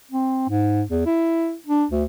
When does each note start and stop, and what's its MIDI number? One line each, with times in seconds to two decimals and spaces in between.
0.11 0.46 60
0.49 0.83 44
0.90 1.03 40
1.06 1.55 64
1.67 1.85 62
1.91 2.04 38